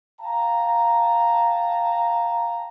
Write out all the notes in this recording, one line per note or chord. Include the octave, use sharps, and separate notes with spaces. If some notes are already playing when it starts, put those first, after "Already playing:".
F5 G5 A5 A#5